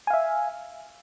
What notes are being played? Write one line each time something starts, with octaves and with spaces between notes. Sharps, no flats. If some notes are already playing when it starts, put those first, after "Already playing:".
E5 F5 G#5